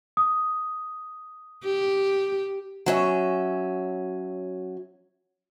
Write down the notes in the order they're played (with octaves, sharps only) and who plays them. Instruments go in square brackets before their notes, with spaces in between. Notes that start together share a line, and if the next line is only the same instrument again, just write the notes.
[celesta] D#6
[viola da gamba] G4
[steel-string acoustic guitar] F#3 C#4 E5